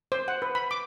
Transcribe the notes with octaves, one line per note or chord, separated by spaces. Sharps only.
C5
F#5
B4
B5
D6